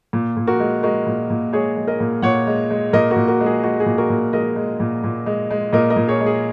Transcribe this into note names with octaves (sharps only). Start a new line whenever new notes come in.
A#2
A#2
F#4 A#4
G#3
G#3 F#4 A#4
A#2
A#2
G#3 G#4 C#5
G#3
A#4 D#5
A#2
A#2 C#5 F#5
G#3
G#3
A#2 A#4 D#5
F#4 A#4
A#2
F#4 A#4
G#3
G#4
G#3 F#4
G#4
A#2
F#4 A#4
A#2
G#3 A#4 D#5
G#3
A#2
A#2
G#3
G#3
A#2 A#4 D#5
A#4 D#5
A#2
G#4 C#5
G#3
G#4